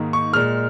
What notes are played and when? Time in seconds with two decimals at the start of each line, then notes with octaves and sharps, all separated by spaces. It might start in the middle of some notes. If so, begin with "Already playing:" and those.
Already playing: G#2 D#3 A#3
0.13 C#6
0.33 A#2 G#3 F6